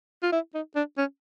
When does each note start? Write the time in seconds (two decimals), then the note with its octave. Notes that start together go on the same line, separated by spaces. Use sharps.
0.23 F4
0.32 E4
0.54 D#4
0.76 D4
0.98 C#4